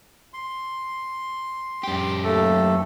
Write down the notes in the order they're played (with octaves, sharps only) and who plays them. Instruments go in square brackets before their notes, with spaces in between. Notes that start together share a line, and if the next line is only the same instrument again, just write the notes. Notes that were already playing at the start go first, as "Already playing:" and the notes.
[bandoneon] C6
[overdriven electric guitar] F#2 G4
[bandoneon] D#2 A3 A4